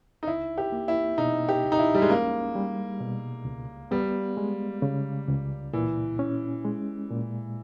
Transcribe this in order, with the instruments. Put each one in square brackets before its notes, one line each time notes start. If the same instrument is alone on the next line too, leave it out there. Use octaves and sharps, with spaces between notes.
[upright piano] D#4
[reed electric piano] C#2 [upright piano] E4
[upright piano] G4
[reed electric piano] A#3
[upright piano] E4
[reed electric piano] B2 [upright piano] D#4
[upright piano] G4
[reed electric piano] C#2
[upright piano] D#4
E4
G3
G#3
[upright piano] A#3 [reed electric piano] C#4
[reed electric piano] G3
B2
C#2
[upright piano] G3 [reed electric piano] B3
[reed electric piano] G#3
C#3
C#2
[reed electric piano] A#2 [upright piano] E3
[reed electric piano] C#4
G#3
A#2